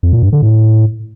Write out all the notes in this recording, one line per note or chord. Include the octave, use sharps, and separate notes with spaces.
F2
A#2
G2
D3
A2